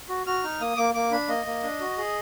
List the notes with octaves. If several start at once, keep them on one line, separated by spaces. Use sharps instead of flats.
F#4
F#4 F6
D#4
A#3 D#6
A#3 D6
A#3 D6
D4 B5
A#3 D#5
A#3
D4
F#4
G#4